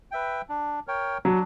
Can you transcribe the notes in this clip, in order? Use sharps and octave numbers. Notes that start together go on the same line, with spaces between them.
B4 E5 G5
D4
A#4 C#5 G5
F#3 D4